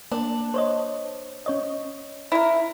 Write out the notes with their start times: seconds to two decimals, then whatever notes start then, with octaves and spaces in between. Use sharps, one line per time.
0.12 A#3 D4
0.54 C5 C#5 D#5
1.46 C#4 C#5 D#5
2.32 E4 A#4